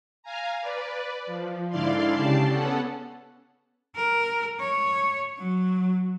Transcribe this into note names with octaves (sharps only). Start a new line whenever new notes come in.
F5 G#5 A#5
B4 D5
F3
G#2 D3 E4 D5 F5 C6
C#3 G4 D5 A5 C7
B3 C#4 A4 F#5
A#4
C#5
F#3